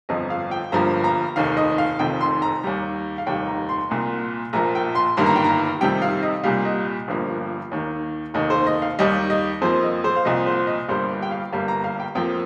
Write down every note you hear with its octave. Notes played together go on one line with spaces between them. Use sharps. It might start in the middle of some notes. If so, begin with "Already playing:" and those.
G1 F2 F3 D#5
F5
G5
G1 G2 F3 A#3 A#5
A#5
F1 D#2 D#3 F5
D#5
F5
F1 F2 D#3 G5
C6
A#5
D#2 D#3 G3
F5
F1 D#2 D#3 G3 G5
A#5
C6
C2 A#2 A#3
A#1 A#2 F3 A#3 A#5
G5
C6
G1 G2 D#3 A#3 C6
A#5
G5
A#5
F2 C3 D#3 G3 G5
F5
D#5
C2 A#2 G3 F5
D#5
G1 G2 F3 A#3
D#2 D#3 A#3
F1 D#2 D#3 A#3 D#5
C5
D#5
F5
D#2 D#3 G3 D#5
D#5
F2 F3 A#3 C5
D#5
C5
F5
C2 A#2 F3 D#5
C5
D#5
G1 G2 G3 A#3 C5
G5
F5
G1 G2 G3 A#3 F5
A#5
F5
G5
F2 F3 A#3 G5